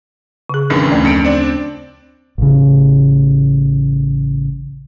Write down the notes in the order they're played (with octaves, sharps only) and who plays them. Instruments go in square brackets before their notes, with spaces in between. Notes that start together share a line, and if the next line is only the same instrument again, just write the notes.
[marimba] C#3 G#4
[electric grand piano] A1 F2 D#3 [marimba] C#4 D4 B4
[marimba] D2 A3 C#4
[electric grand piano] F2 C#7 D7
C4 D4 D5
[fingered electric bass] A1 C#3